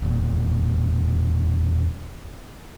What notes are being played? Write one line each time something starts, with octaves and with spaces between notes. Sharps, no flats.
E1 A#2